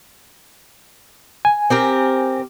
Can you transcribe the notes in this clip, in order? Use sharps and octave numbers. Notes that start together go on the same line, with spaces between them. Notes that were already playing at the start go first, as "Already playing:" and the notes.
G#5
C4 G4 A#4